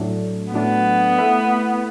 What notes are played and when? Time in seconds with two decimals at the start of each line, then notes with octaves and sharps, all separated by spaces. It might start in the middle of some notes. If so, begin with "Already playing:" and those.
Already playing: A2 F#3 A3 D4
0.53 A2 F#3 A3 B3 D4
1.18 A3 E4 B4